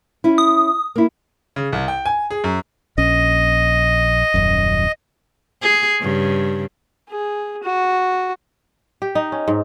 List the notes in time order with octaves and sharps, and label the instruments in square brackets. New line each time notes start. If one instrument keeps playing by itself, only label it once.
[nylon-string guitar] C#4 E4
[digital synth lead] D#6
[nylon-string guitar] A#3 E4
[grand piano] C#3
C2
G5
G#5
G#4
F#2
[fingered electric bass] A#1 C#4 [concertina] D#5
[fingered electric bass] D#1 F#2
[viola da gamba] G#4
G2 C#3
[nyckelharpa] G#4
F#4
[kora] G4
D#4
C#4
G#2